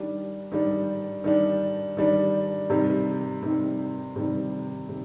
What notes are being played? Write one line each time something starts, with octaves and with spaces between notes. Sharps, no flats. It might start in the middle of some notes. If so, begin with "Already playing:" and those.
Already playing: D#3 G3 D4
D#3 G3 D4
D#3 G3 D4
D#3 G3 D4
C3 D#3 G3
C3 D#3 G3
C3 D#3 G3
C3